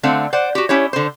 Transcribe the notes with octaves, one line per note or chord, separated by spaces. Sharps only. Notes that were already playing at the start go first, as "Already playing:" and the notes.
D3 A3 C4 F5 F#5
C5 D5 F#5
F#4 G4
C#4 E4 G4 C#5
D3 C5